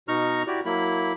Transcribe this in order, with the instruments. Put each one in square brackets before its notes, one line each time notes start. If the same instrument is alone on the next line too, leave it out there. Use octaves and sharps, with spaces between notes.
[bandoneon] B2 D#4 A#5 C#6 F6
E4 F#4 G4 D5
F#3 A#3 E4 B5